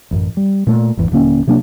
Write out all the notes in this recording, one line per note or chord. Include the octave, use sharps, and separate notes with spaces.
A1 F#2
G3
A#2 A3
G#1 E2
D#1 D3 A#3 C#4
C3 F#3 A#3 D4